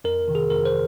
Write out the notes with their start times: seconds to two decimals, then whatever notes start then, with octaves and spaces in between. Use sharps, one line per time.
0.04 F2 A#4
0.28 C3 D#3
0.35 G#4
0.50 F2 A#4
0.65 C5